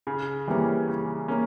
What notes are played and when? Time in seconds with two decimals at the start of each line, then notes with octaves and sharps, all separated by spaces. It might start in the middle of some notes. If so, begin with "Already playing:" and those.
0.07 C#3
0.47 E3 G3 A#3 C#4
0.88 C#3
1.28 A#3 C#4